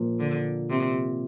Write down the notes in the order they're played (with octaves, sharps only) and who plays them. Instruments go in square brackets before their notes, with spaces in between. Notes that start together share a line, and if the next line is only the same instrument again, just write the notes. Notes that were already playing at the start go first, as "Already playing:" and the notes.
Already playing: [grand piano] A#2 F3 A#3
[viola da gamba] D3
C3